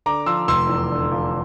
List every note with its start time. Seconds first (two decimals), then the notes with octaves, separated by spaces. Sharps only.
0.06 D3 A#5 D6
0.26 F3 C6 E6
0.48 F1 C6 E6
0.69 E2
0.90 D3
1.12 F3